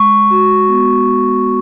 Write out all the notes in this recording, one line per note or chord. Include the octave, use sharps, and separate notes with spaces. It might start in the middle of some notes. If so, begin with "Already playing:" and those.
Already playing: G#3 C#6
F#4
B3